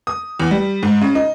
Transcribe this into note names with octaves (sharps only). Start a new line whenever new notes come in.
D#6
E2
G3
G#2
C#3
D#4